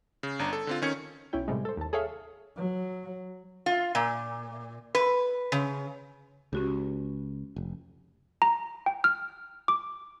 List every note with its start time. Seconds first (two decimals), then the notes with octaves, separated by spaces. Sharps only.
0.23 C#3
0.39 G1 D4 A#5
0.53 A4
0.67 D3 C4 F4
0.82 D#3 C#4 G#6 C#7
1.33 B1 C#4 E4 G5
1.48 A2 C3 G3 G#3
1.65 A4 C5
1.77 D#2 A5
1.93 G#4 A4 C#5 E5 F5
2.57 F#3
3.66 F4
3.95 A#2
4.95 B4
5.52 C#3
6.53 C#2 C#4 F#4 G4
7.56 F1
8.42 A#5
8.86 G5
9.04 F6
9.68 D6